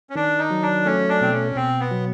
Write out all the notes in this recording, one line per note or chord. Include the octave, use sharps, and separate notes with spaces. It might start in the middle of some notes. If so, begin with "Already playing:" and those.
C#4
D#3 D4
D#4
F#3
D4
A3 C#4
D4
B2 C4
C#4
B2 C4
B3
F#3